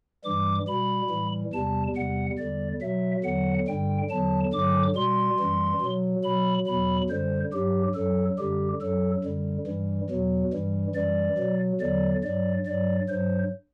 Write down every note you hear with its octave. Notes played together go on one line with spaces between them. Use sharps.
G2 E3 G3 D6
B2 G3 B5
A2 E3 G3
E2 C3 G3 A5
E2 C3 G3 F#5
E2 D3 G3 D5
B2 F#3 E5
E2 D3 F#3 F#5
G2 D3 G3 G5
E2 D3 F#3 A5
G2 D3 F#3 D6
B2 G3 C6
F#2 E3 G3
B2 F#3
B2 F#3 B5
E2 B2 F#3 B5
F#2 D3 G3 C5
G2 F#3 G4
F#2 F#3 A4
F#2 D3 G3 G4
F#2 F#3 A4
F#2 D3 G3
G2 E3 G3
E2 B2 F#3
G2 E3 G3
F#2 E3 G3 D5
B2 F#3
E2 D3 F#3 D5
G2 F#3 D5
G2 F#3 D5
G2 F#3 C5